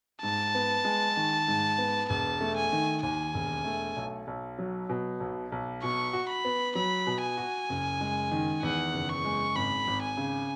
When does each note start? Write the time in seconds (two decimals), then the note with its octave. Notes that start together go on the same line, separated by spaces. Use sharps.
0.22 G#2 A5
0.54 B3
0.85 G#3
1.17 D#3
1.48 G#2
1.78 B3
2.10 E1 A5
2.41 A3
2.57 G#5
2.72 D#3
3.03 D#2 G#5
3.34 E1
3.64 A3
3.96 B1
4.27 B1
4.59 F#3
4.89 B2
5.20 B1
5.52 B1
5.83 B2 C#6
6.13 F#4
6.29 B5
6.45 B3
6.75 F#3 B5
7.07 B2
7.22 G#5
7.37 F#4
7.69 F#1
8.01 G#3
8.31 D#3
8.63 E2 F#5
8.93 F#1
9.09 C#6
9.24 G#3
9.55 G#1 B5
9.87 G#1
10.02 G#5
10.17 C#3